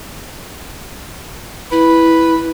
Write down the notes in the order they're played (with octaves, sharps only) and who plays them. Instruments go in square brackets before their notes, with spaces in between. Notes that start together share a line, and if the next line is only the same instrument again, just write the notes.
[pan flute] E4 [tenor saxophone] B4